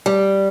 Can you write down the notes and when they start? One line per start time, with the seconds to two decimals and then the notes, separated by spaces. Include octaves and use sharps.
0.06 G3